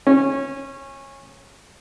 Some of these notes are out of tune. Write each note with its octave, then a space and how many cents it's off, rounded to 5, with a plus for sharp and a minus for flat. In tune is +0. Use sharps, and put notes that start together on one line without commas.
C#4 -20